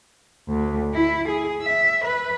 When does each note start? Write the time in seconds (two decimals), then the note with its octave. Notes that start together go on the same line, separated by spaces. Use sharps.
0.48 D2
0.94 E4
1.28 G#4
1.62 E5
2.04 B4